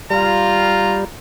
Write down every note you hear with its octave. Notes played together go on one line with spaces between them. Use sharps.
G3 F4 A#5